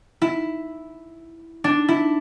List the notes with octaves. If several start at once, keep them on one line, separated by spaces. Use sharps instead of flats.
E4
D4
E4